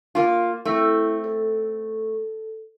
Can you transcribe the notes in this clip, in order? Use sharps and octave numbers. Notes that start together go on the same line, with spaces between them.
A#3 F4
A3 C4 E4 A4
A4